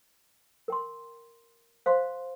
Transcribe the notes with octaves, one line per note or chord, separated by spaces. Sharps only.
A#4 G5 C6
C5 F5 C6